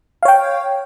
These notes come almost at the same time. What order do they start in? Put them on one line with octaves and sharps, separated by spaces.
F5 C#5 G5